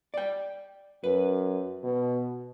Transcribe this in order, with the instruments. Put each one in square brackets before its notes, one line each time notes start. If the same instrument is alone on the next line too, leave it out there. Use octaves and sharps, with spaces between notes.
[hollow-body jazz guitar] D5 G5
[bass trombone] F#2 [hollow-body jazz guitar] B4
[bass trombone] B2